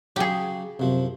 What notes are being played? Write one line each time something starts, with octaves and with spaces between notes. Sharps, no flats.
C#3 F#3 G4 G#4
F#2 C3 F3